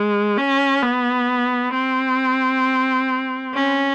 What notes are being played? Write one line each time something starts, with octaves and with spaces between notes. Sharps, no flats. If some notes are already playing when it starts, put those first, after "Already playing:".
Already playing: G#3
C#4
B3
C4
C#4